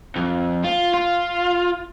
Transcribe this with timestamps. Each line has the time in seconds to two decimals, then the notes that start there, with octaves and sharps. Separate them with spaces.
0.16 F2
0.65 F4
0.94 F4